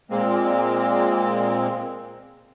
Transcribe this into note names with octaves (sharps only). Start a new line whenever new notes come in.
A#2 G#3 A#3 C4